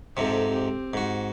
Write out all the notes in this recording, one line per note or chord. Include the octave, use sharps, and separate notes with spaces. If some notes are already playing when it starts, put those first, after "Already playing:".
F2 G#2 C3 C4 A4
C4 G4
G#2 F#4